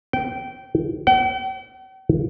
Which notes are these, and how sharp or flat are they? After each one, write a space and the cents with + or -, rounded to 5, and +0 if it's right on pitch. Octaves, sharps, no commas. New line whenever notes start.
G5 -20
G5 -45